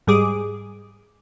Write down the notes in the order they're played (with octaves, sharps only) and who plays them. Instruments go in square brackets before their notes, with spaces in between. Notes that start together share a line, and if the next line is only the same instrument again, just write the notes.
[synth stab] G#2 G3 G#4 D6 D#6